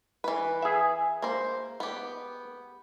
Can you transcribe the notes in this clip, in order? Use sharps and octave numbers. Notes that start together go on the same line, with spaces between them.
E3 B4
G#4 E5
A#3 C5
B3 G4